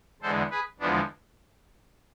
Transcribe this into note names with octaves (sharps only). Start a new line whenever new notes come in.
E2 D3 G#3 A4 C5
G#4 B4
E2 D3 F3 G#3 B3 D4